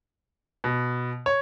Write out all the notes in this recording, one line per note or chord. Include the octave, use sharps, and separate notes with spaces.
B2
C#5